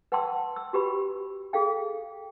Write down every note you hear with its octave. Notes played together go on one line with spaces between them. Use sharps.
B4 F#5 G5 A5 C6 E6
E6
F#4 G4 B4 B5
G#4 A4 F5 G5